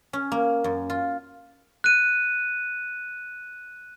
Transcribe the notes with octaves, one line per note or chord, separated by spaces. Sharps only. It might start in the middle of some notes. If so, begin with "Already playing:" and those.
C#4
A#3
F#2
F4
F#6 D#7